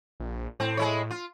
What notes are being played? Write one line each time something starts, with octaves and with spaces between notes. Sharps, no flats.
A#1
A2 C4
G#3 E4 C#5
F4